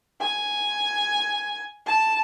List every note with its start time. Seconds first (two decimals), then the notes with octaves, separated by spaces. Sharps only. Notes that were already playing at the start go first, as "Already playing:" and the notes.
0.20 G#5
1.86 A5